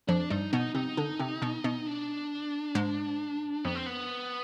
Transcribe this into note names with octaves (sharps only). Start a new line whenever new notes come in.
F2 F3 D4
G2 G3 D#4
B2 B3 D#4
C3 C4 D#4
D3 D4
C3 C4
B2 B3
B2 B3
D4
G#2 G#3
F2 F3 B3
C4
B3